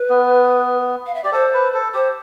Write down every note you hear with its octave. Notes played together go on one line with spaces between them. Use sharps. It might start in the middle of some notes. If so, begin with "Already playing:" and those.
Already playing: B4
B3
F5
E5
G4 D5
A4 C5
B4
A4
G4 C5